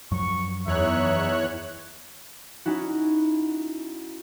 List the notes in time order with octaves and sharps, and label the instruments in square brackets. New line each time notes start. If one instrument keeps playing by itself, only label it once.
[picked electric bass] F#2 F3 F#3 [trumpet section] C#6
[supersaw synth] E2 C#5 F#6 [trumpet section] D#4 E5
[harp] C#4 D#4 E4 F#4